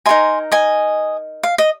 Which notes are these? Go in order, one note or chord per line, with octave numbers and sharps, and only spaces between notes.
D#4 A#4 D#5 G#5 C6
D#5 G#5
F5
D#5